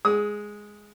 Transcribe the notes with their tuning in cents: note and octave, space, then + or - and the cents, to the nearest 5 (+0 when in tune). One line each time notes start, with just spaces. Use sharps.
G#3 +0 D#6 +25